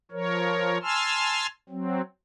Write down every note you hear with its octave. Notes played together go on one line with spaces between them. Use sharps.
F3 A#4 C#5
G#5 A5 C6 E6 F6
F#3 C4